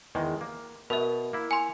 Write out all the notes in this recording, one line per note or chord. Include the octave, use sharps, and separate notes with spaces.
E2 D#3 G#3
A#3
B2 A#4 E5
A#3 E4
G#5 C6